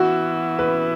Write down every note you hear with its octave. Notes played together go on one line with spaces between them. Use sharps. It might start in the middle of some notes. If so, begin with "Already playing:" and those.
Already playing: E3 B3 E4 F#4
B4